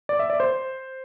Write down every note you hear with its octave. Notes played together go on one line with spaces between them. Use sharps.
D5
E5
D5
C5